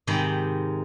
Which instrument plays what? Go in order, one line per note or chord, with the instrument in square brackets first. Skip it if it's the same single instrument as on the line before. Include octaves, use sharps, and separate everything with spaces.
[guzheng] G#2 C3 D#3 G#3 G5 B5